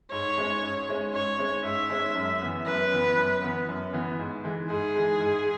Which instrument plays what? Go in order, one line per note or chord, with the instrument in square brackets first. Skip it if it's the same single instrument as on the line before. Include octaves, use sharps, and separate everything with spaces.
[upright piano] G#2 [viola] C#5
[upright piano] G#3 C#4
G#2
G#3 C#4
[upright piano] G#2 [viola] C#5
[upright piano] G#3 C#4
[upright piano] G#2 [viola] E5
[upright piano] G#3 C#4
F#2
E3 B3
[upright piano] F#2 [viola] B4
[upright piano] E3 B3
F#2
E3 B3
F#2
E3 B3
G#2
E3 G#3
[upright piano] G#2 [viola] G#4
[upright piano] E3 G#3
G#2